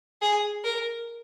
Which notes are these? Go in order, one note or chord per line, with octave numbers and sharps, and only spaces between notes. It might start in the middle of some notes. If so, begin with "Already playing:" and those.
G#4
A#4